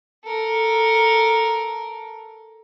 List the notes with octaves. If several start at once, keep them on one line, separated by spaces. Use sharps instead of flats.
A4 A#4